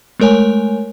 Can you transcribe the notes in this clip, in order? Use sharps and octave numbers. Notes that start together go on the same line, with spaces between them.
G#3 A3 A#4 C#5 G#5